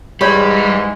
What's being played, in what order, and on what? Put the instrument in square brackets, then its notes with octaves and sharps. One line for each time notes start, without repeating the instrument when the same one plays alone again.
[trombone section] G#2 E3 G#3 [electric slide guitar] G3 [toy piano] G4 C#5 D5 [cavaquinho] B5